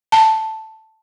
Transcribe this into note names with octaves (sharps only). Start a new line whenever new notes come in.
A5